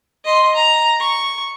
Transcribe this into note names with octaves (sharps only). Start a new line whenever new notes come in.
D#5 C6
A#5
C#6